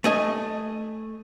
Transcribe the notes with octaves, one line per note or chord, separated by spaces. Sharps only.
A3 D#5 G#5